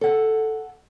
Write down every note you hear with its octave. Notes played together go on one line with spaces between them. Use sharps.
A4 F#5